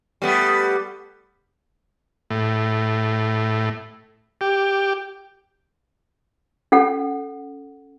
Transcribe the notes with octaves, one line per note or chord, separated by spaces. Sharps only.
G3 A3 B3
A2
G4
C#4 A4 F#5